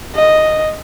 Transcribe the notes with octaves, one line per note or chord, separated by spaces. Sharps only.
D#5